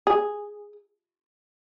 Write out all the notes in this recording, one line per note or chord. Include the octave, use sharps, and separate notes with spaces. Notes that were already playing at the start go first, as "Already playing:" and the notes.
G#4